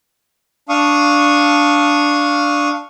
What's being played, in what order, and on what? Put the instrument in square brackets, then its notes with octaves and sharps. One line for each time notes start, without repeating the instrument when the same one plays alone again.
[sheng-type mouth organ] D4 F5 C#6 D#6